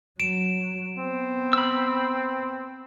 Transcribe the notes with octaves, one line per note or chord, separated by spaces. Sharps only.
F#3 D7 E7
B3 C4
B5 E6